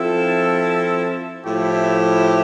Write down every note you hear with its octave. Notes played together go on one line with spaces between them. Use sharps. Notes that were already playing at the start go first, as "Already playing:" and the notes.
Already playing: F3 C4 E4 A4
A2 F3 A3 E4 G4